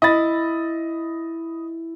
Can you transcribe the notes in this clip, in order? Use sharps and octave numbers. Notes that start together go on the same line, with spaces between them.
E4 D#5 B5 A6